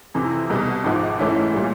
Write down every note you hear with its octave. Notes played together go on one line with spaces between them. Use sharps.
F2 C3 E3
C2 B2 G3
G#1 G#2 F3
G#2 E3 A3 C#4 E4
A#2 G3